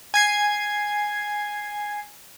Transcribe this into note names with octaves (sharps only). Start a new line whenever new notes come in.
G#5 G#6 C7